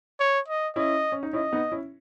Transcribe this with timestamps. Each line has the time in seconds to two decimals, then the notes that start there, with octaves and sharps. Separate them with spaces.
0.20 C#5
0.48 D#5
0.76 C#4 E4 D#5
1.12 C#4
1.23 D#4
1.33 C#4 E4 D#5
1.53 B3 D#4
1.72 C#4 E4